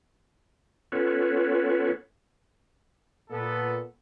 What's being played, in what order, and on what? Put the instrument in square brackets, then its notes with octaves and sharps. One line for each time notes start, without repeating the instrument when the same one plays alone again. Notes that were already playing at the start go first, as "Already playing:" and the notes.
[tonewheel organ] B3 C#4 F4 A4 B4 C#5
[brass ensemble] A#2 B3 A4